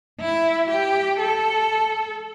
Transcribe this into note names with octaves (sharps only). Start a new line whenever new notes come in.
E4
G4
A4